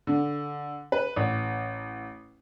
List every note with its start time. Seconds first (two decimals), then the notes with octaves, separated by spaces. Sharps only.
0.07 D3
0.92 B4
1.16 A1